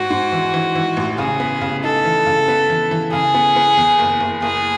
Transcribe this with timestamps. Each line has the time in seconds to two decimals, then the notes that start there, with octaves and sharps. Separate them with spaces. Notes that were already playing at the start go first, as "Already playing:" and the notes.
Already playing: G#2 F#4
0.10 G#2
0.32 E3
0.54 E3
0.75 E3
0.97 A1
1.18 C#3 G#4
1.40 B3
1.61 C#3
1.84 D#4 A4
2.05 E3
2.26 C#3
2.48 B3
2.70 E3
2.91 E3
3.12 C#3 G#4
3.34 B3
3.56 B3
3.77 E2
3.99 F#1
4.20 F#1
4.42 F#1 G#4